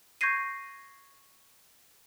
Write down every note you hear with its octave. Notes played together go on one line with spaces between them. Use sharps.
C#6 G6 G#6 A#6 C7 D#7